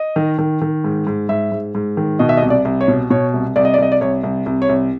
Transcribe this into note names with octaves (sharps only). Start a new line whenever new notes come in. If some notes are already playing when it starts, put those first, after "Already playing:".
Already playing: D#5
D#3
D#3
D#3
G#2
G#2
G#2 E5
G#2
G#2
D#3
B2 D#5
E5
D#5
C2
D5
C2
C#5
B2
B2 C#5
C2
C2 D5
D#5
D5
C2 D#5
D5
C2 C#5
C2
C2
C#5
C2